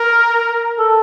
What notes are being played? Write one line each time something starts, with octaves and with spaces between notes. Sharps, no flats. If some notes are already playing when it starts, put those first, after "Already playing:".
Already playing: A#4
A4